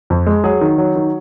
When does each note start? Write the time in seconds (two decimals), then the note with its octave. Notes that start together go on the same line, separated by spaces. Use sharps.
0.10 F2
0.27 G#3
0.44 F#3 G#4
0.61 D#3
0.78 F#3
0.96 D#3